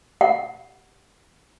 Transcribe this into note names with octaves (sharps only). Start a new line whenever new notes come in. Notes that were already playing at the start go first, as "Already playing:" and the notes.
F#5